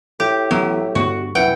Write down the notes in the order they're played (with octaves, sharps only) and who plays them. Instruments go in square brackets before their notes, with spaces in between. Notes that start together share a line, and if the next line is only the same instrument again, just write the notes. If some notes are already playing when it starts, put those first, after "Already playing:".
[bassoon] A2 [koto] G4
[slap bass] A1 B3 [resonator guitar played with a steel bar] F#3
[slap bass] G2 D3 B3 [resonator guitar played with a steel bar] F#4
[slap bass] C2 F#2 F#3 [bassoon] E3 [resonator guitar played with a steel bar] F#5 [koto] G5